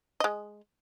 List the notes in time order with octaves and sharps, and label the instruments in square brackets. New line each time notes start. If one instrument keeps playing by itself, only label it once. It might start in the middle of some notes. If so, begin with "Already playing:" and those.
[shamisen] G#3 D#5